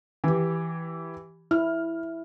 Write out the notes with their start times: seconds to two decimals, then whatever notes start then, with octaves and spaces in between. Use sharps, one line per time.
0.24 E3 G4
1.51 E4 F6